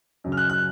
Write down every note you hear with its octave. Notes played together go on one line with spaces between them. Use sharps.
F#2 C#3
F6
F#6
F#6